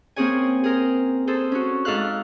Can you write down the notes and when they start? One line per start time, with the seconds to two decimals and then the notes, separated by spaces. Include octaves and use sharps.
0.16 A#3 C4 C#4 G#4 C#5 G#5
0.64 G#4 A#4 C5
1.27 G#4 A4 C5
1.52 C#4 F#4
1.85 G#2 A4 F5 F#6